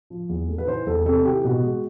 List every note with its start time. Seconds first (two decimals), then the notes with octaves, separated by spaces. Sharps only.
0.10 F3
0.29 E2
0.48 A3
0.58 B4
0.67 E3 C5
0.87 E2 A4
1.06 C3 A4
1.25 E3 G4
1.44 B2 F#4
1.63 G#3